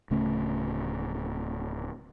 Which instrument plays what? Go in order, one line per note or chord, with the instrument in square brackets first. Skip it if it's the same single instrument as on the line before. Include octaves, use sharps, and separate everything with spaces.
[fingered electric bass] D1 C#3 A3 C#4